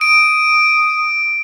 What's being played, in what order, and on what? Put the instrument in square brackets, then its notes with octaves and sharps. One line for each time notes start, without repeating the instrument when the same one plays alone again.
[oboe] D#6 [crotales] D7